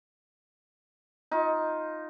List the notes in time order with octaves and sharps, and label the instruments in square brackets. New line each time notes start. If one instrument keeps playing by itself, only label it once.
[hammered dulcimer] D#4 F4